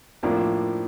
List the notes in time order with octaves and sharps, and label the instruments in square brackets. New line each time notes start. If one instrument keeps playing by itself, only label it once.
[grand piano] A2 F3 A#3 D4